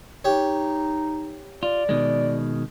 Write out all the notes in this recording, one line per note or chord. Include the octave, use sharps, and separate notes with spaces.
D#4 G4 C#5
F4 D5
B2 D#3 G#3